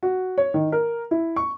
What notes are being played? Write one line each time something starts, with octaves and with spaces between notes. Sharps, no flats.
F#4
C#5
D#3
A#4
E4
C#6